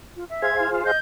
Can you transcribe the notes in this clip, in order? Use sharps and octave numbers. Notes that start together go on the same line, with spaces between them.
F4
E5
G#4 C5 F5 G#6
E4
F4
D#5 G6